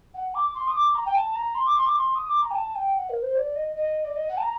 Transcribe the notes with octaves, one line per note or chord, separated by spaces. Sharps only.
F#5
D6
C6
D#6
D6
A#5
G5
A5
A#5
C6
D6
C6
D6
C6
D#6
D6
A#5
G5
A5
G5
F#5
A#4
C5
D5
D#5
D#5
D5
D#5
F#5
A5
A#5